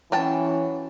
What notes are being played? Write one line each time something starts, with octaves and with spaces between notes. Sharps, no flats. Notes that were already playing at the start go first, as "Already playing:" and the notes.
E3 F#3 C#4 G5 A5